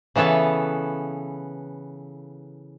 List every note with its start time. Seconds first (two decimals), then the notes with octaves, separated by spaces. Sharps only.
0.16 C#3 E3 B3 A4 C#5